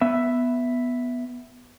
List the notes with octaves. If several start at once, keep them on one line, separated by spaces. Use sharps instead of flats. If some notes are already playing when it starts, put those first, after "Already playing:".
B3 E5